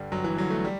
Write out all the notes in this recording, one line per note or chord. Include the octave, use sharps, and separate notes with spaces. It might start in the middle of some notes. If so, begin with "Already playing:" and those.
Already playing: G2 D3 G3
G1 F#3
E3
G2 D3 F#3
A3
G3